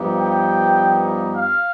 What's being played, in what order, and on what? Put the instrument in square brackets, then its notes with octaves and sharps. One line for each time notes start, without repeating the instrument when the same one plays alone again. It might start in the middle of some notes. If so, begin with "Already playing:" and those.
Already playing: [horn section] G2 F3 B3 D#4 G4
[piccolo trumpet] G5
F5